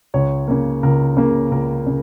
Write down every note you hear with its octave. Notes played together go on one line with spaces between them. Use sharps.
C#2 C#5
C#3 A#3
C#2 A#4
C#3 A#3
C#2 A#4
C#3